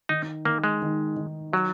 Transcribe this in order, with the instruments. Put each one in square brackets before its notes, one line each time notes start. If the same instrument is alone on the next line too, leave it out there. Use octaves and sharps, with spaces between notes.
[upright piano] D#3 [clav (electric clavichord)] D#4
[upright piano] D#3 [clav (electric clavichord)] A#3
[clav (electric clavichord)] G#3
[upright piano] D#3
D#3
[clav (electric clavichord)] F#3 [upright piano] F#4